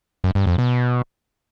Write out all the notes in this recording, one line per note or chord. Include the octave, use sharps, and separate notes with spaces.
F#2
G2
F2
B2